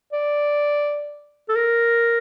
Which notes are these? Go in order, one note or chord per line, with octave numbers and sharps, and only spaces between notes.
D5
A4
A#4